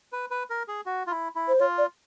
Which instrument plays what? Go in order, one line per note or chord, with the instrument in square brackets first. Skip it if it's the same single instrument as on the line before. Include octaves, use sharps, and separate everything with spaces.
[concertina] B4
B4
A#4
G#4
F#4
F4
E4
E4
[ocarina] C5
[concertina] F4 [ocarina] C#5
[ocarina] D5